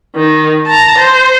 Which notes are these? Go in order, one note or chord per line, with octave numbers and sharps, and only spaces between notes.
D#3
A5 A#5
C5